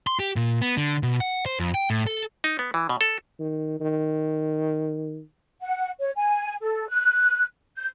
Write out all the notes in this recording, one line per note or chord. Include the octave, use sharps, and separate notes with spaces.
C6
G4
A#2
B3
D3
B2
F#5
C5
F2
G5
A2
A4
D#4
B3
E3
B2
A4
D#3
D#3
F#5
C#5
G#5
A4
F#6
G6